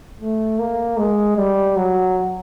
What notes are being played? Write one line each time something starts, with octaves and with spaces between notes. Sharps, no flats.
A3
A#3
G#3
G3
F#3